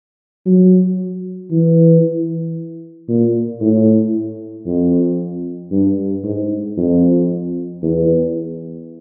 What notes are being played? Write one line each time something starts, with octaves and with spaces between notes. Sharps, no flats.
F#3
E3
A#2
A2
F2
G2
G#2
F2
E2